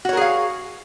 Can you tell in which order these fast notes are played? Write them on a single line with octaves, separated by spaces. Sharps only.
F#4 C#5 A#4 G#4 F5